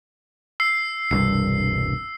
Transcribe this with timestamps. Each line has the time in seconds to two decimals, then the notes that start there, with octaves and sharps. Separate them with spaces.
0.60 E6 C7
1.11 E1 C2 G2 C7